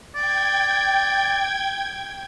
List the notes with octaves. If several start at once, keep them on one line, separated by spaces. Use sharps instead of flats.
D5 G5 G#6